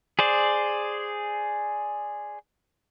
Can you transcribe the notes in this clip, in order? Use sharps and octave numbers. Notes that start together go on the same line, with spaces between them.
G#4 C5 D5